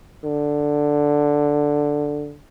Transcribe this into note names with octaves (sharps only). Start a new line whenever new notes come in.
D3